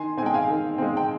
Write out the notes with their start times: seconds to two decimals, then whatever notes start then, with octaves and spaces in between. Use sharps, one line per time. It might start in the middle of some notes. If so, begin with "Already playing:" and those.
Already playing: D#3 G#5 C6
0.17 C4 G#5
0.23 G#3 G5
0.34 F5 G#5
0.48 D#3
0.78 G#3 C4
0.97 G5